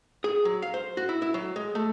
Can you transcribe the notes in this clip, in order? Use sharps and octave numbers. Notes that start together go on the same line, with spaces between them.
G#4
F#3
F5
C5
F#4
E4
E4
F#3
G#3
A3